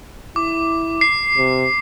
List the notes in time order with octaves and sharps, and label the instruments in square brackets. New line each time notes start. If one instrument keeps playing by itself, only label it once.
[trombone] E4 [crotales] D6
[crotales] C7
[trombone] C3